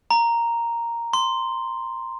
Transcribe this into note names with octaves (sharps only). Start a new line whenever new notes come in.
A#5
C6